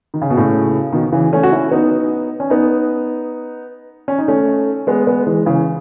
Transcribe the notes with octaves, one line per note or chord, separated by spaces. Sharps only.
D#3
C#3
B2
A2 C#3
B2 D#3
C#3 E3
A3 C#4
F#4
C#4 E4
B3 D#4
C#4
B3 D#4
C#4
D#4
A3 C#4
G#3 B3
G#3 B3
E3 G#3
C#3 E3